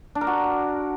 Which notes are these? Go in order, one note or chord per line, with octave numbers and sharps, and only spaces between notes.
D4
A#4
F#4